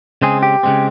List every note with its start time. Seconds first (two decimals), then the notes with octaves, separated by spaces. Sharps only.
0.22 C#3 G#3 C4 G#4
0.43 G4
0.63 C#3 G#3 C4